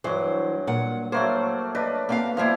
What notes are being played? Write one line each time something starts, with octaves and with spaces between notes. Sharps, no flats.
G2 E3 F#3 C5
A#2 F#5
F#3 A3 A#3 C5
D4 B4 D#5
B2 A#3 C4 F5
F3 G3 A#3 E4 C5 F5